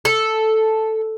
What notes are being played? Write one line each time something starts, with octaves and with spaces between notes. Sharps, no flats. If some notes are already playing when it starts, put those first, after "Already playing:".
A4